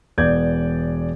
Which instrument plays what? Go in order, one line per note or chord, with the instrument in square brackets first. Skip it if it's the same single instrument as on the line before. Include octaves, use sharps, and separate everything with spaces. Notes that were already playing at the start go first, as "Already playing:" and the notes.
[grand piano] E1 B3 D5 G6 G#6